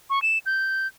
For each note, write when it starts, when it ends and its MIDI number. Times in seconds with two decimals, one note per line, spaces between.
0.10 0.22 85
0.22 0.39 100
0.46 0.87 91